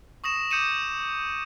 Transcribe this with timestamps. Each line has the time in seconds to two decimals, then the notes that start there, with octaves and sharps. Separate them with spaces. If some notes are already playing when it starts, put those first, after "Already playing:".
0.24 C#6 D#6 A#6 E7
0.51 D6 D#6 G6 C#7 D#7 E7